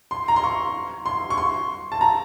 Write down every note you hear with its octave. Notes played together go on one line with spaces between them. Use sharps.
C6
A#5
C6
C#6
C6
C#6
C6
A5
A#5